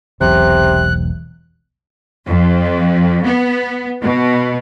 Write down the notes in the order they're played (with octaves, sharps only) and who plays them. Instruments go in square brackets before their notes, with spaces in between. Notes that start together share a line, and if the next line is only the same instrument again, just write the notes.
[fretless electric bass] E1 B1 [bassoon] C3 [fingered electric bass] E3 [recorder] F#6
[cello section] F2
B3
B2